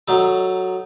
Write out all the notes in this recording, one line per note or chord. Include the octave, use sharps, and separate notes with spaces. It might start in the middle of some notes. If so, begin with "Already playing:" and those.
F#3 D#4 A4